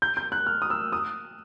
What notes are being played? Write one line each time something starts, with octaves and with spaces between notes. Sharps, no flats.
G6
G6
F#6
F6
D#6
E6
D#6